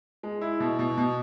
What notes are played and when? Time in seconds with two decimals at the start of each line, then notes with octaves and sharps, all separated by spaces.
0.23 G#3
0.41 E4
0.60 B2
0.79 B2
0.97 B2